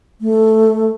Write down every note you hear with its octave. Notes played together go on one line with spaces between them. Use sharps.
A3